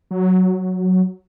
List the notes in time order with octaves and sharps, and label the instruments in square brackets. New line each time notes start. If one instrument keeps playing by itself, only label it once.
[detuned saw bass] F#3